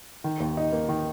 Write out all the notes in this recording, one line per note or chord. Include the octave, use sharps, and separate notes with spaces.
D#3
D#2
D#4
A#3
D#3